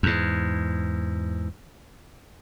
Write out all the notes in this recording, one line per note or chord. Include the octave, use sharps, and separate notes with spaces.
E2 G#2